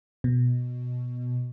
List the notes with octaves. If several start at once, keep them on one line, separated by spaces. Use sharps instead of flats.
B2